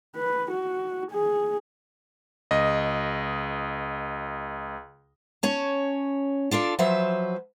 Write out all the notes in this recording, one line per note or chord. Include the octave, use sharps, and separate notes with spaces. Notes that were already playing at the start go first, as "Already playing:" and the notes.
B4
F#4
G#4
C#2 D#5
C#4 C#5 A5
D4 F4 A4 D5
F3 F#3 B4 C5 E5